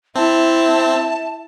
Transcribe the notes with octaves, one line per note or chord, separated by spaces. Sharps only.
C4 E4 E5 A5